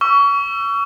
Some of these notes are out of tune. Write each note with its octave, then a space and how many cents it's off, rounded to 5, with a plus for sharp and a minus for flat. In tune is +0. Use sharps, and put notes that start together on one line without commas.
C#6 +30 E6 +35